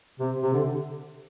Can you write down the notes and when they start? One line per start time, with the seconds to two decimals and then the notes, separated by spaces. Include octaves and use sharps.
0.20 C3
0.43 C3
0.54 D3